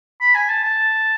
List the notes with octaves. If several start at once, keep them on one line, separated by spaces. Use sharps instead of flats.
B5
G#5
A5
A5